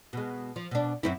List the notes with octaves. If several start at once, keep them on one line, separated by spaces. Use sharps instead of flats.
B2 G#3
F3
B2 D4
F#2 C4 E4